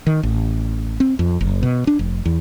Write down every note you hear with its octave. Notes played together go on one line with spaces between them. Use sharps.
D#3
A1
C4
F2
F#1
B2
D4
F1
E2